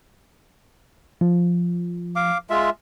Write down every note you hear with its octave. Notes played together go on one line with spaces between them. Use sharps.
F3
F5 D6
G#3 F4 E5